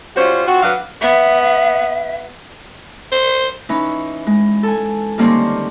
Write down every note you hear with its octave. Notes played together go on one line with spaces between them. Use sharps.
G3 C#4 F4 F#4 C5
C4 F4 F#4
F#3 D4 B4 F5 F#5
B3 E5
C5
E3 C#4 D#4
G#3
A4 G#5
D3 D#3 G3 A#3 C4 C#4